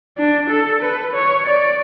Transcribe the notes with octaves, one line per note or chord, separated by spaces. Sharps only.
D4
A4
B4
C#5
D5